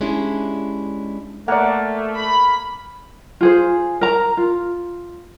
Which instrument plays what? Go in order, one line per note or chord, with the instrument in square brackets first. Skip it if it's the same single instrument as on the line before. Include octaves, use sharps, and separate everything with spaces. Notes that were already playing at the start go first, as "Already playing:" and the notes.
[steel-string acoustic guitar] G#3 C#4 D4 E4 G4 G#4
[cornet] A3 [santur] A#3 [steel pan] D5 F#5
[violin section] B5
[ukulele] F4 G#4 C5
A#4 A#5
F4